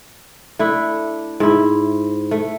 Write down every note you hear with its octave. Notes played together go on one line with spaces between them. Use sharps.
A3 D4 E4
G#2 E4
A3